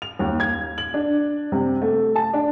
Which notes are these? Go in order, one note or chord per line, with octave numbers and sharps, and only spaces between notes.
F7
D#2
G#6
F#7
D4
C3
A3
A5
D4